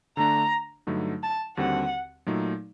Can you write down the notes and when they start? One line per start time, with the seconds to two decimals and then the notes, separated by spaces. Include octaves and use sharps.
0.17 D3 A3 D4 A#5
0.87 G2 D3 F#3 A3 D#4
1.23 A5
1.57 D#2 D3 G3 C4 F#4 F#5
2.27 A#2 F#3 A3 D#4